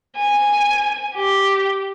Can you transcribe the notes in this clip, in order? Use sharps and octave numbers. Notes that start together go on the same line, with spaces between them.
G#5
G4